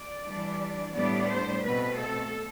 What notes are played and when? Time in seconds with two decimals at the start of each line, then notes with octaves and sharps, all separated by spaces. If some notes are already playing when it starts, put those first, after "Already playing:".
Already playing: D5
0.25 E3 G3 D4
0.95 A2 G3 B3 D4 D5
1.30 C5
1.64 B2 A3 C4 B4
1.99 A4